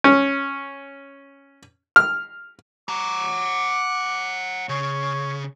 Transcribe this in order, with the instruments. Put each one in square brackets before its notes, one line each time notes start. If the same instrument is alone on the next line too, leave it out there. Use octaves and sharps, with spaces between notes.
[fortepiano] C#4
F6
[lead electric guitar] F#5 A#5 [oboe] D6
[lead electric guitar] C#3 [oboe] C#5